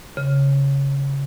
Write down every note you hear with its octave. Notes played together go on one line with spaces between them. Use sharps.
C#3